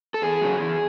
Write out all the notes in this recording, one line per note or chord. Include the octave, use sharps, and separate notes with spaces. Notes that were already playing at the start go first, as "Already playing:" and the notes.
A4
E2 G#4
C#3 F#3
E2